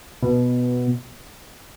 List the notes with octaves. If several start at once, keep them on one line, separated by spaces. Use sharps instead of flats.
B2